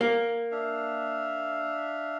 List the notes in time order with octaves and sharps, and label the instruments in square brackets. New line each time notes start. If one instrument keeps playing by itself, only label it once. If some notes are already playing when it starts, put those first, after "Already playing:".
[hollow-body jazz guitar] A#3
[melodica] D4 E5 F5